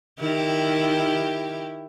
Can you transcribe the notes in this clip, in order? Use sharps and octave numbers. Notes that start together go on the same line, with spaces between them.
D#3 E4 G4